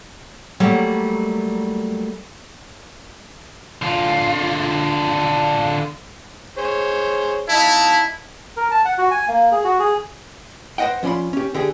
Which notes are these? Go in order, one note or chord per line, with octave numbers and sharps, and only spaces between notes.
F#3 G3 A3 A#3
D3 F4
G#4 C5 C#5
D#4 E4 F5 A5
A#4
A5
F#5
F#4
G#5
A#3
G#4
F#4
G#4
B4 C5 D#5 F#5 G5
F3 C#4 F4 D5 B5 C6
C#4 G4
D3 G4 G#4